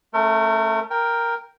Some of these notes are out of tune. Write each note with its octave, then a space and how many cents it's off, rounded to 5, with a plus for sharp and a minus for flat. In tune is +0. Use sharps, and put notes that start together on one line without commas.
A3 +0 C#4 -35 A#4 -35
A#4 +0 G5 +5